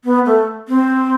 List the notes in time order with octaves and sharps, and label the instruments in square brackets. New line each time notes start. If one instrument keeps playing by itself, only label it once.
[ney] B3
A3
C4